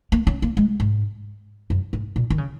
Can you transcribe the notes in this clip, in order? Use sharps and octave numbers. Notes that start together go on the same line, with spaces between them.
A#3
C#4
A#3
G#3
G#2
F#2
G#2
A#2
D#3
C#3